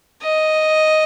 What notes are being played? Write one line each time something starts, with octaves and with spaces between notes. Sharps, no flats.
D#5